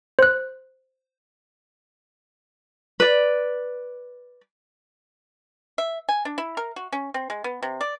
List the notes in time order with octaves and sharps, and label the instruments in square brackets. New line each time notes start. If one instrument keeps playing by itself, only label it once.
[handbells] C5 F#6
[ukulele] B4 D5
[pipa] E5
G#5
D4
E4
A#4
F#4
C#4
C4
G#3
B3
C3
D5